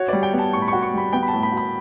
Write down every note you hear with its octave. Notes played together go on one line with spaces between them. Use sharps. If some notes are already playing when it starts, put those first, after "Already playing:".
Already playing: F#4 C#5
G3 D5
G5
B3
A5
A2 C#6
B5
F#4 C#6
C#6
G3 B5
B3 G5
B5
A5
A2
B5
F#4
B5